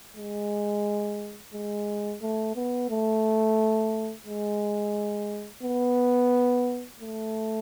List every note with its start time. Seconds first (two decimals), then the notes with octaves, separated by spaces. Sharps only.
0.16 G#3
1.53 G#3
2.22 A3
2.55 B3
2.90 A3
4.26 G#3
5.63 B3
7.00 A3